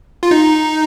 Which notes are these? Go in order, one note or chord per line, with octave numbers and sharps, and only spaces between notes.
F4
D#4